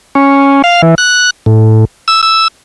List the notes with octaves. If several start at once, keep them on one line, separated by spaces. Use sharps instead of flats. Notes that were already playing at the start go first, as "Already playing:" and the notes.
C#4
F5
E3
F#6
A2
E6
E6